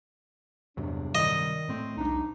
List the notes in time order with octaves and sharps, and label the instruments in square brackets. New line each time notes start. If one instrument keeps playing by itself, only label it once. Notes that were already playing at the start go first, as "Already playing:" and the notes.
[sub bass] E2 [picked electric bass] G2 C3 F#3 [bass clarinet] D4
[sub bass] D#3 [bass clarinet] G3 [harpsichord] D#5
[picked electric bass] A2 A3 [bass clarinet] C4
[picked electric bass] E1 D4 [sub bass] C2 [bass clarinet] D#4